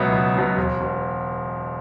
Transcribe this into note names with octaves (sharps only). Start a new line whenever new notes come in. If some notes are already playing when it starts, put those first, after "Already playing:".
Already playing: C#2 B2 F#3 B3 C#5 E5
C#2
B2 F#3 B3
E1
B2